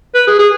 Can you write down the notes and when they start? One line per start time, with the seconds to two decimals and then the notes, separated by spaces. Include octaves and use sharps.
0.14 B4
0.27 G#4
0.39 G#4